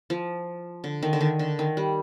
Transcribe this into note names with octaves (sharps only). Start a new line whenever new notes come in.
F3
D3
D#3
D3
D#3
D3
D#3
G3